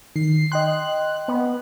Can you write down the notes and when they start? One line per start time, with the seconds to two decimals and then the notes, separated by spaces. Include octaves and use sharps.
0.16 D#3 C7
0.52 D#5 G5 C6 F#6
1.28 B3